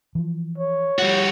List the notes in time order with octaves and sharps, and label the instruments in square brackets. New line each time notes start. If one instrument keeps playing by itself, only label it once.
[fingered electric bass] E3 F3
[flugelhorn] C#5
[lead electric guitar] G3 F#4